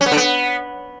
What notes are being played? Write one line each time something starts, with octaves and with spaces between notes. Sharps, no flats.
C#4
B3
D3
B3